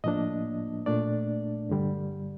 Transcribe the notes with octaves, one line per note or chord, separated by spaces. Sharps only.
A2 F3 A#3 D4 D#5
A#2 A3 D4 D5
G2 D3 G3